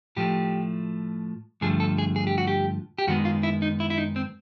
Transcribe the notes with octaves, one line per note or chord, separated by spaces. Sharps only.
A2 F3 A3 G4
G2 D3 F3 A3 G#4
A4
G#4
G#4
G4
F#4
G4
G4
F#2 D#3 G#3 B3 F#4
F4
E4
D#4
E4
E4
D#4
C4